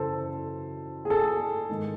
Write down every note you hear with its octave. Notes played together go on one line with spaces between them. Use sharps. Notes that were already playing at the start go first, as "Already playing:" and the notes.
Already playing: F#2 C#3 E3 A4 C5
G#4
A4
G#2 D#3